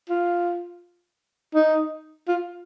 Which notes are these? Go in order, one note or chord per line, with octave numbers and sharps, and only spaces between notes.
F4
D#4
F4